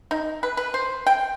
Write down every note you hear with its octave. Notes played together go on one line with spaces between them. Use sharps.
D#4
B4
B4
C5
G5